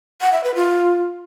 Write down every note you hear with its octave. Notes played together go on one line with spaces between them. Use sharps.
F#5
E5
B4
F4